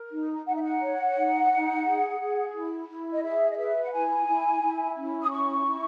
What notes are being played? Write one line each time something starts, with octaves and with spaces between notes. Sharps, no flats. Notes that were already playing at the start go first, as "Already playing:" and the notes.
Already playing: A#4
D#4
D#4 F#5
E5
F#5
C#5
D#4
D#4
G#4
G#4
E4
E4
D#5
G#4 E5
D#5
B4 E5
F#5
E4 G#5
E4
E4
C#4
D#6
E4 C#6
E4